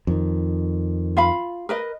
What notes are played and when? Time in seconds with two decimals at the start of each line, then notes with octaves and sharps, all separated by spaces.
0.07 F2 D#3
1.17 F4 F5 B5
1.69 A#4 B4 D#5